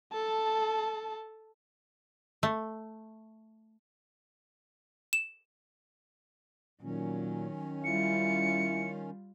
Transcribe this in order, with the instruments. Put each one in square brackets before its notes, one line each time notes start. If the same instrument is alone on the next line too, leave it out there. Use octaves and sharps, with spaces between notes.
[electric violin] A4 A5
[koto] A3
[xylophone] E7
[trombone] A#2 [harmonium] D#3 C#4 [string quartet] F#3
[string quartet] G3 F4 [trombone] E4 [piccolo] C#7